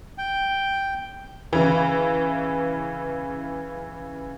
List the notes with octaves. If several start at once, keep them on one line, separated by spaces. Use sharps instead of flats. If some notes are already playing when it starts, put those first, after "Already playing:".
G5
C#3 E3